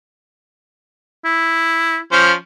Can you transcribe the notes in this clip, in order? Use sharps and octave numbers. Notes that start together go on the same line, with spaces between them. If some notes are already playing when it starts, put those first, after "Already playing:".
E4
F3 C#4 C5